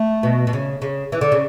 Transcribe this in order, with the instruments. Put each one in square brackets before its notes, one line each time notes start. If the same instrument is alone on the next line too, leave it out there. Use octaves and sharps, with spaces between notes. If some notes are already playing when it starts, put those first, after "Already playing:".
Already playing: [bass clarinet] A3
[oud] B2
B2
C#3
C#3
E3
D3
C#3